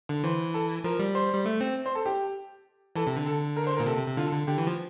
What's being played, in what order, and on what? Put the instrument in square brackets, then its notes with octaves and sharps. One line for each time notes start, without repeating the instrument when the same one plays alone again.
[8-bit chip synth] D3
[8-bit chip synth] E3 [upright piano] C5
[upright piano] A4
[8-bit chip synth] F3 [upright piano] A#4
[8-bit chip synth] G3
[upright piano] C5
[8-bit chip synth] G3
A3
C4
[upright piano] C5
A4
G4
[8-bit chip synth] E3 [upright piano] A4
[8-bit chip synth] C3
D3
[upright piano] A4
A#4
C5
A#4
[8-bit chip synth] A#2
[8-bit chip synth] C3 [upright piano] A4
[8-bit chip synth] C3
C3
[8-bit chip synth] D3 [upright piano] F4
[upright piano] A4
[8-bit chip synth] D3
[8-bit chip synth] D3 [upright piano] G4
[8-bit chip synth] E3
F3